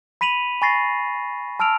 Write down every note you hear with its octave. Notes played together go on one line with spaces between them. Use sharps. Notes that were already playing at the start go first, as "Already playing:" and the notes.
B5 B6 D#7 F7 F#7
G#5 B5 C#6 A6 A#6 C7
A5 E6 F6 D7 F7